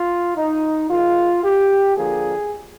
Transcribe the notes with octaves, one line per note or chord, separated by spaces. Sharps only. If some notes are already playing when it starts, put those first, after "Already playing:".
Already playing: F4
D#4
D#3 G#3 F4
G4
D3 F3 A#3 G#4